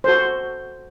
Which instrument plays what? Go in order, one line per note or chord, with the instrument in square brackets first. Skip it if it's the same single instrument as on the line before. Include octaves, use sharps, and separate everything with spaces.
[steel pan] F#4 A4 C5